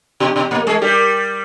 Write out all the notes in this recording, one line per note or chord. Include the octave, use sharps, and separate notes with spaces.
B2 G4
B2
A#2 A#3
A#4
G#3 G#4
G3 G4 A#4